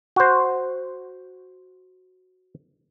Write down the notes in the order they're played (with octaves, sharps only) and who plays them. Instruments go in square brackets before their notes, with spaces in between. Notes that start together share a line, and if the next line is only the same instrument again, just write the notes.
[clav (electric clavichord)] F#4 C5